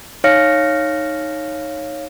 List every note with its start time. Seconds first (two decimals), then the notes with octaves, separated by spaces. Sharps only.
0.24 D#4 C#5 F5 F6 A#6 C#7